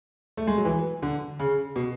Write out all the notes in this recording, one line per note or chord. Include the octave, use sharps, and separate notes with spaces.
A3
G#3
F#3
E3
D3
C#3
B2